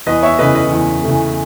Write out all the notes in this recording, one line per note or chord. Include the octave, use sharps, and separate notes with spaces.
E2 B4 D#5
C#5 E5
C#3 E3 A3 B4 D#5
B4 D#5
E2
C#3 E3 A3